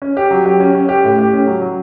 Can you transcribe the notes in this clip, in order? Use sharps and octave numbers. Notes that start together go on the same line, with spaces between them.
C#4
G4
F#3
G4
C#4
C#4
G4
A2
G4
C#4
F#3
F#3